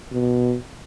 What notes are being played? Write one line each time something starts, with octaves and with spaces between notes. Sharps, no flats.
B2